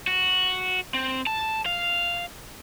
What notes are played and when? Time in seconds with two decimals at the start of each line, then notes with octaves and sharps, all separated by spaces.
0.07 F#4
0.94 C4
1.27 A5
1.66 F5